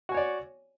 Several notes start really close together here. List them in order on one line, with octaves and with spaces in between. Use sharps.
F#4 G#5 C#5 D5